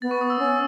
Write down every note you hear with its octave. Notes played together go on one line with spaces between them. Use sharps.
B3 A6
C#6
D#6
E6
C#4